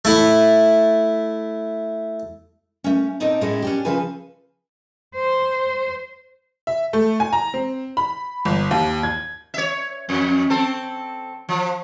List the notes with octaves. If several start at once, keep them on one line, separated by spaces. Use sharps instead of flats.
A3 E4
A3 C#4
A#2 C4 D#4 A4 D5 A5
A2 G#3 A3 C#4 E4
C#4 D4 G4
C#3 F3 G#4 A4 B4 G#5
C5
E5
A3
G#5
A#5
C4
B5
G1
D#2
G#6
C#5 E5
F2
C4 A4
F3